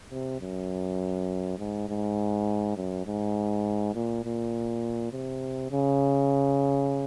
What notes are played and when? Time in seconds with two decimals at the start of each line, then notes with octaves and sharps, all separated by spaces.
0.11 C3
0.41 F#2
1.58 G#2
1.88 G#2
2.77 F#2
3.06 G#2
3.94 A#2
4.24 A#2
5.12 C3
5.71 C#3